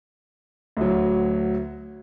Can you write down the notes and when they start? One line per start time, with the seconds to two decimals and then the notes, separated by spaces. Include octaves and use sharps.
0.77 D2 F#3